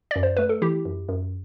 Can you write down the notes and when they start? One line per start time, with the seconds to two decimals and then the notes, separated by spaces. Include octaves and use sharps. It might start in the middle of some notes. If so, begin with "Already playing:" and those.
0.11 F#2 D5
0.23 C5
0.37 A3 B4
0.49 A4
0.62 E3 E4 G4
0.85 F#2
1.09 F#2